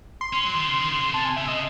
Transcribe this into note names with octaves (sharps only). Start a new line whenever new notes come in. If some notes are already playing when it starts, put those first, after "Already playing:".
C6
C#4
F#3
D#3
C#3
D#3
C#3
C#3
C3 A5
G#5
C#3 E5
C#3 D#5